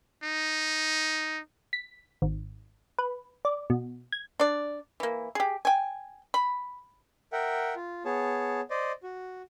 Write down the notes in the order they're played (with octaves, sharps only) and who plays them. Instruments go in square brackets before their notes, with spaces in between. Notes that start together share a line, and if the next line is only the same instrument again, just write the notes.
[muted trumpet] D#4
[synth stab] B6
G#1
B4
D5
B2
G#6
[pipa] D4 D5
E3 A#3
G4 G#4
G5 G#5
B5
[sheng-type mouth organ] A#4 E5 F#5 G5
F4
B3 G#4 C#5 A5
C5 D5 D#5
F#4